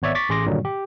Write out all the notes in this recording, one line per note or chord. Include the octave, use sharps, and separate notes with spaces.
G#1 B3 C#5 D5 E5
C#6 D6 A6 B6
A1 G#4 C6 D6 A#6
G2 A#2 D3 D#3 F#3 G3
G4